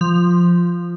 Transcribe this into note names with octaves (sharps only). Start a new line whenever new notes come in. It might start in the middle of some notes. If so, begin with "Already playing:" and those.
F3